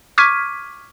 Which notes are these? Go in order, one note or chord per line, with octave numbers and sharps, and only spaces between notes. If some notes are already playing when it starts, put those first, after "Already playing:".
C#6 D6 F6 G#6 B6 D#7